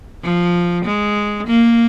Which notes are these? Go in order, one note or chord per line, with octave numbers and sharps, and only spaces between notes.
F3
G#3
A#3